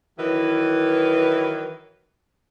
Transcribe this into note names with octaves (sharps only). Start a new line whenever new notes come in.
D#3 E3 F#3 E4 B4